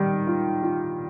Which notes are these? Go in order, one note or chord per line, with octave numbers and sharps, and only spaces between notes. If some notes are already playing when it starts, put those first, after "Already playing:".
Already playing: D#3 G3
F4
F4